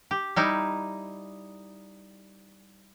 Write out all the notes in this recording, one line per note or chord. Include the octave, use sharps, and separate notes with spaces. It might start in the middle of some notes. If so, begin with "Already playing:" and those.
G4
G3 D#4 E4